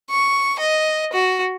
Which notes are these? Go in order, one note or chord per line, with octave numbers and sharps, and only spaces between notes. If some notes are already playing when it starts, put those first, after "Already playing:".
C#6
D#5
F#4